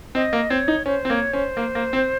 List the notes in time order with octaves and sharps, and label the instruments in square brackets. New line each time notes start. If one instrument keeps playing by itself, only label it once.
[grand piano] C4 [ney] D#5
[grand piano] A#3
[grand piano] C4 [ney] C#5
[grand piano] D#4
[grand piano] C#4 [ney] C5
[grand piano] C4
[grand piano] A#3 [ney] C#5
[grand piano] C#4 [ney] C5
[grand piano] A#3
A#3
C4